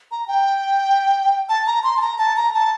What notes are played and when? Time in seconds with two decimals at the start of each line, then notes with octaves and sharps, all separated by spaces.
0.11 A#5
0.28 G5
1.49 A5
1.67 A#5
1.84 C6
1.97 A5
2.02 A#5
2.18 A5
2.37 A#5
2.54 A5